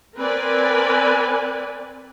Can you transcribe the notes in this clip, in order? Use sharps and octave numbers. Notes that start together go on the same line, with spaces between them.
C4 A#4 B4 D5 G#5